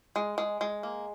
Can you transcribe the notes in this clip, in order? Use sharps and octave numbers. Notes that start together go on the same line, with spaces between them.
G#3
G#3
G#3
A#3